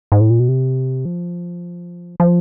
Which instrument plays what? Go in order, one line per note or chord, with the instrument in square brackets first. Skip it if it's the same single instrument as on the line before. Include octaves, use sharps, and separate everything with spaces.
[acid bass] G#2
A2
A#2
B2
C3
F3
F3